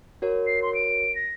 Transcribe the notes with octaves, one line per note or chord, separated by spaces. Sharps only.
F#4 A#4 C#5
C7
C6
D7
A#6